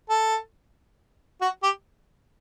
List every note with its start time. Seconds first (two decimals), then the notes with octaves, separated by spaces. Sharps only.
0.10 A4
1.42 F#4
1.63 G4